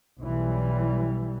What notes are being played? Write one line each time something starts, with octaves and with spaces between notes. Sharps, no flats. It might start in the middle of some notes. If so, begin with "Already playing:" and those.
B1 E3 G3